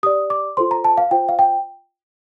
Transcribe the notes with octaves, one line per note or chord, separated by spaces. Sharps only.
G4 D5 D#6
D6
F4 A4 C5 C6
A#5
A5
F5
F4 C5 G5
F5
G5